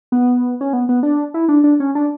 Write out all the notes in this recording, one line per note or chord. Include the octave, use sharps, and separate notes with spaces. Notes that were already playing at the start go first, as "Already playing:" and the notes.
B3
C#4
B3
B3
D4
E4
D4
D4
C#4
D4